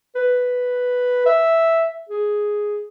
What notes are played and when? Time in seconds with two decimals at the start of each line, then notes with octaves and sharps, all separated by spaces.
0.15 B4
1.26 E5
2.09 G#4